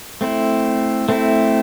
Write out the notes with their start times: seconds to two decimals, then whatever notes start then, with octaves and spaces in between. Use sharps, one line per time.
0.21 A3 C4 E4
1.09 A3 C4 E4